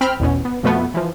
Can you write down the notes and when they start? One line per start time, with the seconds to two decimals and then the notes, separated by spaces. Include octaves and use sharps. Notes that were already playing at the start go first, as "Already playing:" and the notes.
0.01 C4 G5 B5 F6
0.19 A1 E2 B2 C#4
0.45 B3
0.63 F2 B2 F3 A3 B3
0.94 E3 F3